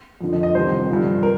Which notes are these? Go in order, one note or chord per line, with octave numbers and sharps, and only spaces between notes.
F2 D3 F3
D#5
D#5
C2 C3 D#3 C5
G2 D3 F3
A#4